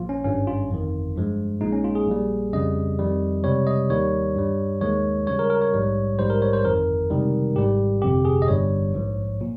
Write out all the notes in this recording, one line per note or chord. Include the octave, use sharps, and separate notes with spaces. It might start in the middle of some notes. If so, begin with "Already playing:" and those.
Already playing: A#1 A#2 F3 F4
C#4
G#1 G2 G3 C#4
F4
G1 F2 D#3
G2 F3 G#3
A#1 A#2 G#3 D#4
C#4
F4
G#4
A#1 A#2 G3
F2 C#3 G3 D#5
F2 D#3 G3
C#2 C3 G3 C#5
D#5
D#2 D#3 G3 C#5
G2 G3
D#2 D#3 G#3 C#5
C#2 C#3 G3 C#5
A#4
A#4
C#5
A#1 G#2 G3
A#1 G#2 G3 C5
A#4
C#5
C5
G1 F2 D#3 A#4
C#2 C3 D#3 G3
G#1 G#2 G3 G4
G1 F2 C3 G4
G#4
D#5
G1 G2 G3 C#5
A#1 G#2 F3
A#2